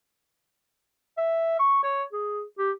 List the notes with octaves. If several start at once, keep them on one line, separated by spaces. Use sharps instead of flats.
E5
C#6
C#5
G#4
G4